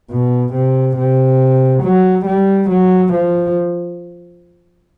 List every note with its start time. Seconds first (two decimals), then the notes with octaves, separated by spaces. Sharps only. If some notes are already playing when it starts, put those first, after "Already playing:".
0.11 B2
0.54 C3
0.97 C3
1.83 F#3
2.26 G3
2.70 F#3
3.13 F3